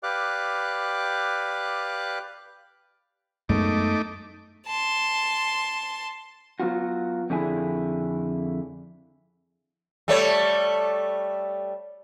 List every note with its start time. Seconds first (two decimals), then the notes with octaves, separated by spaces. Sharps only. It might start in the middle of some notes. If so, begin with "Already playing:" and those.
0.03 G4 B4 D5 F5 D6 F#6
3.49 F#2 G#3 A3 B3 D#4 D6
4.66 A5 C6
6.60 F#3 B3 F4 F#4
7.30 F2 D3 E4 G#4
10.08 G3 A3 C#5